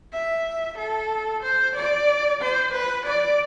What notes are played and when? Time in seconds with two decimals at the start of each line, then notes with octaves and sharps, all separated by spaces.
0.13 E5
0.78 A4
1.43 C5
1.75 D5
2.41 C5
2.73 B4
3.06 D5